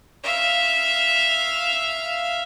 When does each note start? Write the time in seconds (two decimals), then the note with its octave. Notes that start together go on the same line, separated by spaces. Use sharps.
0.24 E5 F5